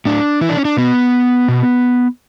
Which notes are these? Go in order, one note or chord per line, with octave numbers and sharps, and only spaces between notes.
A2 D4
E3 E4
D4
C#4
D4
B2 B3
B2